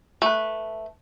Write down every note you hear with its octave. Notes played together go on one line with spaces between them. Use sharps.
A3 B4